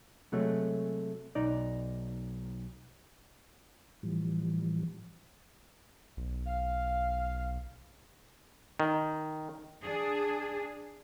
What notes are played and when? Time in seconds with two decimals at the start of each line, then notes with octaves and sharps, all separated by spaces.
0.32 C3 F#3 G#3 A3
1.35 B1 D#4 D5
4.03 A2 E3 F3 G3
6.17 B1
6.47 F5
8.80 D#3
9.82 D4 G#4